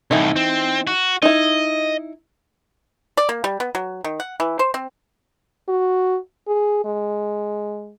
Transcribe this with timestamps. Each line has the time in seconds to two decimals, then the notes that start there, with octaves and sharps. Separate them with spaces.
0.11 C2 A2 E3 D#4
0.36 C4
0.87 F#4
1.22 D#4 E4 D#5
3.17 D5
3.29 A#3
3.44 G3
3.60 B3
3.75 F#3
4.04 D#3
4.20 F#5
4.40 E3
4.59 C5
4.74 C4
5.68 F#4
6.47 G#4
6.85 G#3